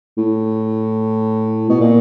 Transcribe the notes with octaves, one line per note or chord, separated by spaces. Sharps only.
A2
B2
A#2